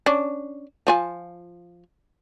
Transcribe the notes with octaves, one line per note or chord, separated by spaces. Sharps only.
C#4 D4
F3 F4 G#5